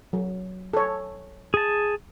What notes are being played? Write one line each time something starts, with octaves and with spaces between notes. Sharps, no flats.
F#3
A4 C#5
G#4 A5